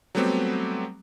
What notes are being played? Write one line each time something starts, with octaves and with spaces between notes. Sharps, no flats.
F#3 G3 A3 B3 C4 G4